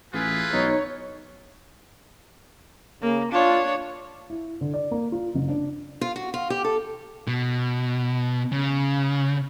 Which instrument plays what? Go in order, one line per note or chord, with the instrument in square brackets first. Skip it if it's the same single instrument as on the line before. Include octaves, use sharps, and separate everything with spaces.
[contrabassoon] A1 [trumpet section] E4 F4 B4 [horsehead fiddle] G#4
[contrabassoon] B1 [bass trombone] D#4 [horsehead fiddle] C#5
[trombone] C#3 [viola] A#3
[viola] D4 C#5 [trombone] F4
[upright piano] E4
D3
D5
A#3
F4
F#1
D4
[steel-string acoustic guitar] F4
F#4
F4
G4
A4
[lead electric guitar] B2
C#3